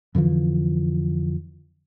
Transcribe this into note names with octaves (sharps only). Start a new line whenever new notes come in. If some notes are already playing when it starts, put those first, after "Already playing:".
F2 D3 E3 F3